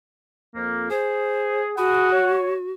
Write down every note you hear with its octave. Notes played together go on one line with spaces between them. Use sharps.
F2 A#3
G#4 C5
F#4 G#4 F#5 B5 D#6
C#5